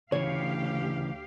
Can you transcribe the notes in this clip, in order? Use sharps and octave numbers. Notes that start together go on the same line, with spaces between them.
D2 C#3 E3 G4 C#5 F5